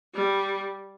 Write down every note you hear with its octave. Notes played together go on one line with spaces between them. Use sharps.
G3